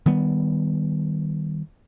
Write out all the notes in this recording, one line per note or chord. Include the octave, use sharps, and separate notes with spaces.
D#3 G3 B3